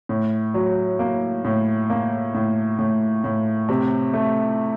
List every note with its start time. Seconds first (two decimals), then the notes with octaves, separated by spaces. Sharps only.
0.09 A2
0.54 F#3
0.99 A#3
1.45 A2
1.90 A#3
2.35 A2
2.79 A2
3.24 A2
3.69 C3
4.13 A3